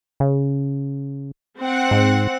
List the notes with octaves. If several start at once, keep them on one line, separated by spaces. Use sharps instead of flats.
C#3
C4 F#5
G#2